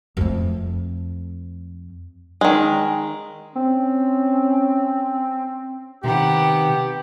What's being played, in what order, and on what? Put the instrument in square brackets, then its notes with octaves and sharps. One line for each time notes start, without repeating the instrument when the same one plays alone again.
[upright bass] F2 A3
[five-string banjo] D#3 G#3
[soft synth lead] C4 [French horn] C#4
[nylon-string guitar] C3 D#3 [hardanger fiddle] B3 F#5 [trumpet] G4 [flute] G5